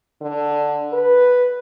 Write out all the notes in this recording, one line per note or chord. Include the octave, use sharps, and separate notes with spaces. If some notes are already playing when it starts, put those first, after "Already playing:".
D3
B4